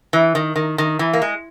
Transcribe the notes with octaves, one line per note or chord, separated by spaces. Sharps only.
E3
D#3
D#3
D#3
E3
A#3
G#3